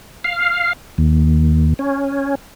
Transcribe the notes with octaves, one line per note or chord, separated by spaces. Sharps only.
F5
D#2
C#4